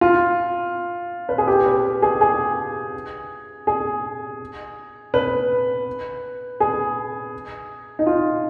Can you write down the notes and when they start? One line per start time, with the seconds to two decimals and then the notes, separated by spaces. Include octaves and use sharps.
0.01 F4
1.29 B4
1.38 G#4
1.48 G4
1.66 B4
2.02 G#4
2.21 G#4
3.67 G#4
5.14 B4
6.60 G#4
7.99 D#4
8.06 F4